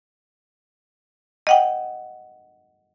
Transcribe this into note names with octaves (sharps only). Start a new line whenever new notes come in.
D#5 F#5 G5